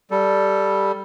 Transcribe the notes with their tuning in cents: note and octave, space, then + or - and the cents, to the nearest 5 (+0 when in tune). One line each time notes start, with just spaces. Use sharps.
G3 +0 A4 +0